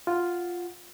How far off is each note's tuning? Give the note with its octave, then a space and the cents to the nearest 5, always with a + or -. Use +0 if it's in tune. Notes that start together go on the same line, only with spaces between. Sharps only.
F4 +0 F#5 -5